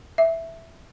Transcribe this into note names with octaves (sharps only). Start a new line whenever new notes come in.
E5